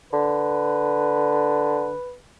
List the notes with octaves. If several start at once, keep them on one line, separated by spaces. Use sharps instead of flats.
D3 B4